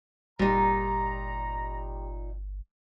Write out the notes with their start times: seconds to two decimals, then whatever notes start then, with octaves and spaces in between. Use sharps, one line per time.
0.39 G1 A#2 G3 D#4 A#5